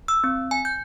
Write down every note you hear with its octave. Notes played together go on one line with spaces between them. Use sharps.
E6
C4
G#5
G6